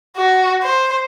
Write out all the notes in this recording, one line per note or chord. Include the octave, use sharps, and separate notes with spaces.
F#4
C5